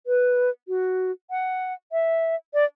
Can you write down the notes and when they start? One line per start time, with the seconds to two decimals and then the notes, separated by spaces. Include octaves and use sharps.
0.07 B4
0.68 F#4
1.30 F#5
1.92 E5
2.54 D5